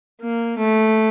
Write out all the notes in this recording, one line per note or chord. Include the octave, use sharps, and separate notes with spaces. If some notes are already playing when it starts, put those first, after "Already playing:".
A#3
A3